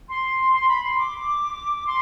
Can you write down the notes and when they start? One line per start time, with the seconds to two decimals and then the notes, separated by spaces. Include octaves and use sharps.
0.09 C6
0.53 C6
0.68 B5
0.83 C6
0.98 D6
1.86 C6